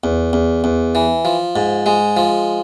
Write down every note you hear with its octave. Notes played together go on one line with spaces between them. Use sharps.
E2
E2
E2
E3
F3
G#2
G#3
F3